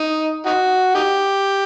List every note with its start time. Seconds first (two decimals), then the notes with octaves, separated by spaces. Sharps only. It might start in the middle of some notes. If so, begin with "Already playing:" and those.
Already playing: D#4
0.46 D#4 F#4
0.95 D#4 G4